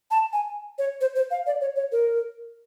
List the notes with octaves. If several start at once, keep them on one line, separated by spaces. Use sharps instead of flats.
A5
G#5
C#5
C5
C5
F5
D5
C#5
C#5
A#4